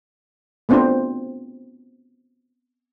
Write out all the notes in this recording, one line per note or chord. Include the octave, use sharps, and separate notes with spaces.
A3 B3 C4 D4 F4 C5